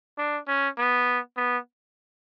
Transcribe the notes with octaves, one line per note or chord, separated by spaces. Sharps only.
D4
C#4
B3
B3